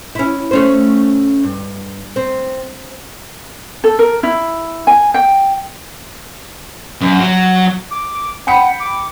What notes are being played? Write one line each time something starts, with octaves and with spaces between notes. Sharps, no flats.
C#4 E4
A3 C#4 C5
G2
C4
A4
A#4
E4
G#5
G5
F#2
F#3
D6
F#5 G5 B5 C#7
D6